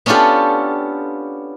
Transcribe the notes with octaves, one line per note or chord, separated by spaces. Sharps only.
B3 C#4 D4 F4 G4 A4